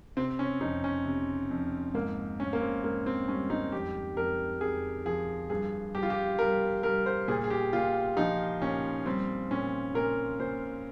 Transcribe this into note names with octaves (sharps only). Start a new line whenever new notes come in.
C3 C4
C#4
F2 D#4
C#4
C3
F2
G#2 A#3
G#2 C#4
A#3
C4
G#2 A#3
C4
G3 C#4
D#4
F2 G4
F2 A#4
F2 G#4
F3 G#4
G2 G#4
G2 G4
F4
G4
G3 A#4
G3 A#4
C5
A#2 G#4
G#4
G4
A#2 F4
F3 D#4
A#2 C#4
G3 C4
A#2 C#4
A#2 A#4
A#2 C5